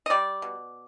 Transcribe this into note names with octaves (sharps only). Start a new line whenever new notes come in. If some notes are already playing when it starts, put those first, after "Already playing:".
D#5
G3 D5
B2